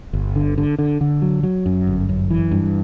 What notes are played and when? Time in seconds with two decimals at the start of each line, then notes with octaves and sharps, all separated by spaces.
0.13 G1
0.36 D3
0.58 D3
0.79 D3
1.01 D3
1.22 F#3
1.43 F#3
1.66 F#2
1.87 G1
2.09 F#2
2.30 E3
2.51 G2